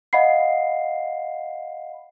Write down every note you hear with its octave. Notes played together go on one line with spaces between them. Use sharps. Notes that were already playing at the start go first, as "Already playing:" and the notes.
D#5 F5 F#5 B5 C7